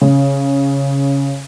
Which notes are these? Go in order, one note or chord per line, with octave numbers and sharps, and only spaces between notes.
C#3